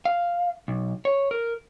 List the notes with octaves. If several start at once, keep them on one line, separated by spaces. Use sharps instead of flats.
F5
B1
C#5
A#4